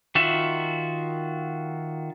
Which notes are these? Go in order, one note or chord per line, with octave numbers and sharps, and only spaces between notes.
D#3 F4 F#4 E5